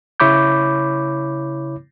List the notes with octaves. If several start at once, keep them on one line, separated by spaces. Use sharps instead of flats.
C#3 E4 C#5 B5 D6 G6